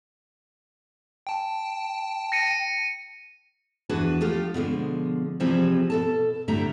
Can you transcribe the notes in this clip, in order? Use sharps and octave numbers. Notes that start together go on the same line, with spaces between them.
G5 A5
A#6 C#7 D#7
E2 D4 F#4 G#4 B4 A5
F3 A3 F4 G4
B2 D3 F3 G#3
C3 E3 F3 G3 C4 G#4
B2 A4 A5
A2 D3 G3 A3 E5 A#5